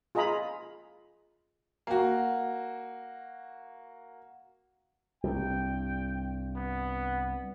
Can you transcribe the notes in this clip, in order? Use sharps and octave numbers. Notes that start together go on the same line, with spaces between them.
F4 G#4 D#5 A#5 B5
A#3 F#4
C2 G2 G5
B3